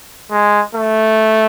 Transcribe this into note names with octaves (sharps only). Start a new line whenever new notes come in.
G#3
A3